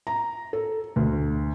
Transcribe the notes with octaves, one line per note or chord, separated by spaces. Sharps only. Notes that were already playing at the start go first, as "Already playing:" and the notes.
A#5
A4
D2